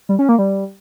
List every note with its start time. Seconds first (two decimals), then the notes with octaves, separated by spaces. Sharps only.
0.09 G3
0.19 C#4
0.29 A#3
0.39 G3